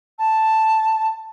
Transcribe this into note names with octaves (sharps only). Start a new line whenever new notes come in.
A5